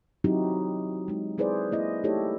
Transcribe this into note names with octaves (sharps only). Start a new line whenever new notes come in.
F#3 C4 D#4 E4 F#4 G4
G#3 D#4
C4 E4 G#4 B4 C5 D5
A#3 E4 D#5
A3 D#4 E4 G4 A4 C#5